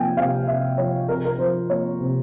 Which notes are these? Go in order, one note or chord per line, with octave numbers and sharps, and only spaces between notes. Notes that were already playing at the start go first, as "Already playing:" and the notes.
Already playing: C3 F3 A#3 G5 G#5
C3 F5
C3 E5
F3 C#5
C3 A#4
A#4
F3 C5
A#3 C#5
C3